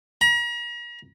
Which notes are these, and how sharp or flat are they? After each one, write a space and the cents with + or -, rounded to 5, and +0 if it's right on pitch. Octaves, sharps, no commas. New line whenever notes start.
A#5 +40